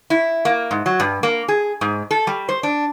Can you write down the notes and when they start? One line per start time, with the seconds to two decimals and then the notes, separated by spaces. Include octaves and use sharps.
0.10 E4
0.45 A#3
0.71 G#2
0.86 F#3
1.00 G2
1.23 A#3
1.48 G#4
1.81 G#2
2.11 A4
2.27 G3
2.49 C5
2.63 D4